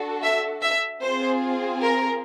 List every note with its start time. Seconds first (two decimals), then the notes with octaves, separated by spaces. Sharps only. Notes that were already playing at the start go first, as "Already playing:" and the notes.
Already playing: D4 F#4 A4
0.23 E5
0.62 E5
1.02 C4 F4 G#4 C5
1.82 A#4